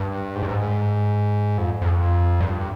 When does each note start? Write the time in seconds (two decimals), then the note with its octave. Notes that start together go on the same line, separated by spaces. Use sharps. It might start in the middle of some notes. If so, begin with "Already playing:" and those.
Already playing: G2
0.36 G#2
0.43 G2
0.51 G#2
1.58 F2
1.82 F2
2.41 G2